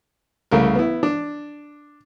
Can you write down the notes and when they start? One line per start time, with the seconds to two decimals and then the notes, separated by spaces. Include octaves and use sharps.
0.51 C2 C#3 A3 A#4
0.75 B3 E4
1.03 D4